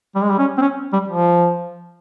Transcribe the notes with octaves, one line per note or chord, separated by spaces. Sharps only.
G3
G#3
G3
C#4
C4
C#4
G3
F3